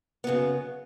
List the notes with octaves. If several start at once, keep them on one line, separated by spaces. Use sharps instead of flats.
F#2 C#3 B3